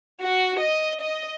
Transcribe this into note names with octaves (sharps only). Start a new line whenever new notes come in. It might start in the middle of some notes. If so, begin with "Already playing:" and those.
F#4
D#5
D#5